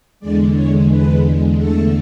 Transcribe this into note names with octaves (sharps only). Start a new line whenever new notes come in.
E2 D3 G#3 D5
C#5
B4
E2 D3 A3 A4